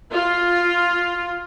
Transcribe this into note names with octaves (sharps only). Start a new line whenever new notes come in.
F4